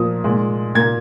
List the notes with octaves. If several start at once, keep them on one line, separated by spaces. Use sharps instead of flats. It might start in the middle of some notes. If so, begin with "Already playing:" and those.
Already playing: A#2 F3 A#3 D#6
A#2 G#3
A#2 A#3 G#6